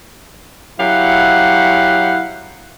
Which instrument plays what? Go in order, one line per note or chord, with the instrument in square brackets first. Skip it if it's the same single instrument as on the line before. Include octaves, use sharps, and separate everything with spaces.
[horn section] F#3 E4 G4 F5 F#5